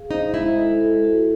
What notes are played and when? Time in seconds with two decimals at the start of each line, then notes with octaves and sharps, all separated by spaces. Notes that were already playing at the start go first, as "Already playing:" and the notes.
Already playing: G#4 F5
0.11 D#4 C5
0.34 G#3 E4
0.57 A4
0.81 A4
1.04 F#4